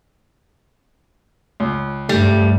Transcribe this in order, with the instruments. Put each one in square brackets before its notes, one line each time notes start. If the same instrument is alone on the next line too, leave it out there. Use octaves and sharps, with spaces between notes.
[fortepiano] C#2
[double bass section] G2 [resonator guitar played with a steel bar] G3 [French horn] A3